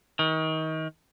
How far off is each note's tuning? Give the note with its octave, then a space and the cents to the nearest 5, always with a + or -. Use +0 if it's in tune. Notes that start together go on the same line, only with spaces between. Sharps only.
D#3 +30